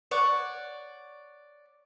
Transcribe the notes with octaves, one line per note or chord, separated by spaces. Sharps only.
C#5 D5 F#5